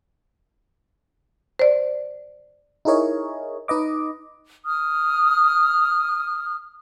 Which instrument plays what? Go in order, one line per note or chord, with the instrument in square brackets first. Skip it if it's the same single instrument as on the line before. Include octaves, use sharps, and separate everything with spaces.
[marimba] C5 D5
[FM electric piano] D#4 E4 G#4 A#4 C#5 D#5
D#4 B4 D#5 D6
[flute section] D#6 F6